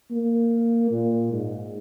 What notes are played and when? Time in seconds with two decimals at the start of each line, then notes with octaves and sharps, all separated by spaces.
0.11 A#3
0.91 A#2
1.32 G#2